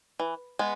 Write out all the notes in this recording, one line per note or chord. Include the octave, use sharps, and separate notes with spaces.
E3
G#3 B3